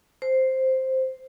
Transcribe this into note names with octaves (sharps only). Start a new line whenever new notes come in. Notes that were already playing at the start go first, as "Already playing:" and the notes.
C5